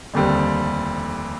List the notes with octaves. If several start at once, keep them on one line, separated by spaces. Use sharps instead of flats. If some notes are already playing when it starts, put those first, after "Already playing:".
F1 D#2 D3 G3 C4